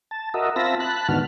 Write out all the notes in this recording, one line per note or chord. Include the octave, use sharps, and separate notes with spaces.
A5
F#4 A#4 D#5 E5
C4 F4 E5 A5 B5 A#6
A5 B5 F#6
G#2 D3 D#3 B3 F#4 F6